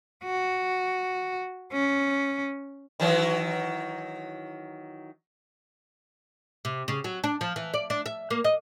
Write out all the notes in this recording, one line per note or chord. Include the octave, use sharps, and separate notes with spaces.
F#4
C#4
D#3 E3 F#3
C3
C#3
F#3
D4
F3
E3
D5
D4
E5
A#3
D#5